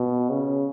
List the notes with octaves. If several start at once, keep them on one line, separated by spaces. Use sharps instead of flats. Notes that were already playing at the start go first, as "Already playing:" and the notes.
Already playing: B2
C#3